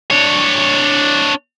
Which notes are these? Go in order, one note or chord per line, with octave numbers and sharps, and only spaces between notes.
D4 C#5